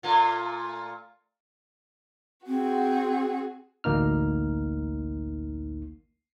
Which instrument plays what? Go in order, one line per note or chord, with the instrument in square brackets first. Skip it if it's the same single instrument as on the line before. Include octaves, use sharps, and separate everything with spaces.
[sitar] A#2 A3 F4
[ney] C4 [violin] F#4 G#4
[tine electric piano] A1 D2 A#3 D#4 F6